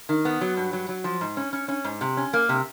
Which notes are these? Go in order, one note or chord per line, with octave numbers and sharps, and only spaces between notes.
D#3
B3
F#3
G2
F#3
F#3
F3
G#2
C#4
C#4
C#4
G#2
C3
C#4
A#3
C3